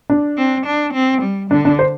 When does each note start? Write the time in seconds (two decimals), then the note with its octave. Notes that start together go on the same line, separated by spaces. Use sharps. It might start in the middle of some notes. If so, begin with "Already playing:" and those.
0.10 D4
0.38 C4
0.67 D4
0.94 C4
1.23 G3
1.51 D3 D4
1.65 D4
1.79 C5